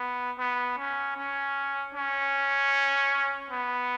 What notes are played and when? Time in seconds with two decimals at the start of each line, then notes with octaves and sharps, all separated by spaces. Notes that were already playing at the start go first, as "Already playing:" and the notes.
Already playing: B3
0.38 B3
0.78 C#4
1.17 C#4
1.95 C#4
3.51 B3